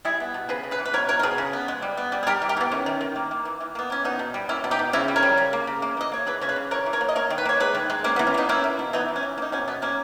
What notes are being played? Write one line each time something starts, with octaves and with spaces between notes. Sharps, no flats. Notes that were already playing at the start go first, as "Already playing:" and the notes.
G3 E4 G#4
B3
B2
C#3 G#4 B4
C#3
G#4 B4
E3
B4
B2 A#4 C#5
B2 A#4 C#5
A#4
B2 G#4 B4
C#3
B3
G#3
G3
B3
G3
G#4
G3 G4 A#4
E3
G4 A#4
E3 B3
D#3 C#4
D#3
D#3
A#3
A#3
E3
E3
A#3 B3
E3 C#4
B2 B3 D#4
B2
G3
A#3 C#4 E4
B2
D#4 G4
B2
C#3 C#4 E4
G3
A#4 C#5
G3
C#3
A#3
C#3
A#3
E3 D#5
A#3 C#5
E3 G#4 B4
C#3 C#5
G#4 B4
C#3
E3 A#4 C#5
E3
A#4 C#5
A#3
D#5
A#3 A#4 C#5
D#3
B4
A#3 C#5
G#3 G#4 B4
D#3
G#3
A#3 C#4
B3
E3
C#4
A#3 B3 D#4
A#3 C#4 E4
A#3
B2
E3 B3 D#4
E3
C#4
E3
A#3 D#4
B2 C#4
B2 B3
A#3 C#4